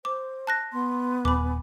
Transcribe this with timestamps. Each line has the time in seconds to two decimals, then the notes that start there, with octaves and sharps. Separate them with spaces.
0.05 C5 D6
0.47 A5 F#6 A#6
0.73 B3 C6
1.25 D#1 G#5 B5 D6